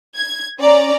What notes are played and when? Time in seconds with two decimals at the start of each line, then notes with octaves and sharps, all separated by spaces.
0.16 G#6
0.59 C#4 D5 A#5